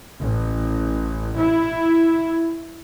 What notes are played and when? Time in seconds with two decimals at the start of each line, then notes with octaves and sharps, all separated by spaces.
0.20 A1
1.37 E4